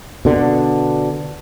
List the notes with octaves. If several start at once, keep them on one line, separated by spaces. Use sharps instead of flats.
B2 D3